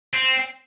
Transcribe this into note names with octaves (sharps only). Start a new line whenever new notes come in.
C4